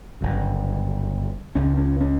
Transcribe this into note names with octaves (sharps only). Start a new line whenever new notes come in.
G1 F#2 C#3
C#2 C#3 C#4
C#4
C#4